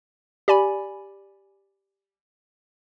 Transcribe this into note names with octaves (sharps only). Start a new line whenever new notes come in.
G4 D5 G#5 B5